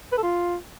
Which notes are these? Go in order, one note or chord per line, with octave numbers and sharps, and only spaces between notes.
B4
A4
F4